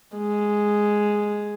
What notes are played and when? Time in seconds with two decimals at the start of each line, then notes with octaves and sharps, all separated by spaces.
0.16 G#3